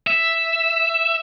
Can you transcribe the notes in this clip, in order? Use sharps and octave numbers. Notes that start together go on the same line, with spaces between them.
E5